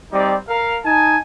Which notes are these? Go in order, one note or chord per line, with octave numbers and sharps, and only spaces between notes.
G3 C4 D#4 D5
A#4 F5
D#4 G#5 A5